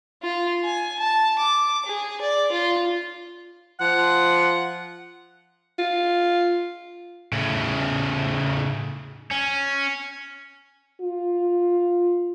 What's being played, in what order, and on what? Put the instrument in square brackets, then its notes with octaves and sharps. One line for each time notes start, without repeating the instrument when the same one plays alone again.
[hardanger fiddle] F4
G#5
A5
D6
G#4
D5
F4
[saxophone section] F3 F#5
[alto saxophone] F4
[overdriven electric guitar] A2 C#3
C#4
[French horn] F4